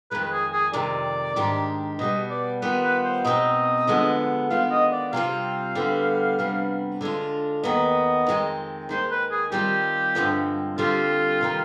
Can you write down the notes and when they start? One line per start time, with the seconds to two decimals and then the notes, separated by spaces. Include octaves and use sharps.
0.11 F2 D#3 G#3 B4
0.24 B4
0.32 G#4
0.53 G#4
0.73 F2 C3 D#3 G#3 D5
1.36 G#2 D#3 G#3 D4 G4
1.99 B2 G3 B3 D#5
2.30 D5
2.62 D#3 G3 B3 F4 B4
2.83 B4
3.04 C5
3.24 B2 G#3 C4 D#4 D#5
3.87 D3 F3 G#3 B3
4.50 D#3 G#3 B3 F4 F5
4.71 D#5
4.92 D5
5.12 C3 G3 C4 F4 F5
5.75 D3 G3 B3
6.39 F2 C3 G3 B3 D4
7.01 D3 G#3 D4 F4
7.63 D#2 D#3 B3 D#5
8.27 F2 D#3 G#3 C4
8.89 D#2 D#3 G#3 C5
9.11 B4
9.31 G#4
9.52 D#3 G3 C4 F4 G4
10.15 G2 D3 F3 G#3 C4
10.78 D3 G3 C4 F4 G4
11.41 C3 D#3 G3